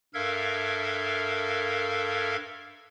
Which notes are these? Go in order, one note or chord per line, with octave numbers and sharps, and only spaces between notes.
G2 A4 A#4 E5 F5 G#6